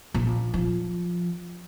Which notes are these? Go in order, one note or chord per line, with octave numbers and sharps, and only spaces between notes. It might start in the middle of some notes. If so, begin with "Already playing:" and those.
A#1
F3